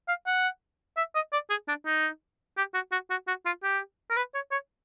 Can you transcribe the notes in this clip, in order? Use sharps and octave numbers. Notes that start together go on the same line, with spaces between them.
F5
F#5
E5
D#5
D5
G#4
D4
D#4
G4
F#4
F#4
F#4
F#4
F4
G4
A#4
B4
C#5
C#5